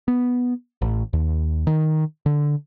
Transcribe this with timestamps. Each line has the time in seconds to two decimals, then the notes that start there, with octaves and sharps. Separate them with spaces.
0.08 B3
0.82 A1
1.13 D#2
1.67 D#3
2.26 D3